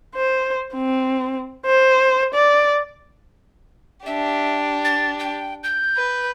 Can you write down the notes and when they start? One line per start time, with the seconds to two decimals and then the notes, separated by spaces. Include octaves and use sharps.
0.15 C5
0.74 C4
1.66 C5
2.35 D5
4.06 D4 G4 E5
4.85 A6
5.19 G5
5.64 G6
5.96 B4